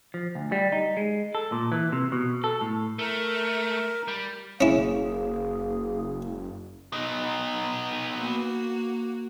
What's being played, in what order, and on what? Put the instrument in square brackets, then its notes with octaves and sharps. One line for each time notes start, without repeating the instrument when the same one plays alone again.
[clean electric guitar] F3
D2
G3
D#4
G#3
A4
A#2
E3
C3
B2
A4
A2
[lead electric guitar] A3 [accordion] A#4
[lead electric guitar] G3
[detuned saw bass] F#1 [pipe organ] A#3 G#4 [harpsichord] C#4 E4
[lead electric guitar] B3 D#4
[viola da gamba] A#3 F#4